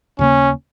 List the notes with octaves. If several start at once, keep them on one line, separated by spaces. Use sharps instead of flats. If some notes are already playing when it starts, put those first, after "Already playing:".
D#2 C#3 A#3 C#4